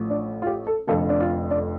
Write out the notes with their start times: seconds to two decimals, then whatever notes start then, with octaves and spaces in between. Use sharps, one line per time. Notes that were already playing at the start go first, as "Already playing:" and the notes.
Already playing: A1 A2 F3
0.10 D4
0.42 F4
0.46 G4
0.67 A4
0.87 F1 F2 D3 F3 A4
1.09 D4
1.20 F4
1.51 D4